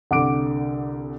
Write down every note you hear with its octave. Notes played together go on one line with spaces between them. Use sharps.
C2 D3 F#5 D6 D7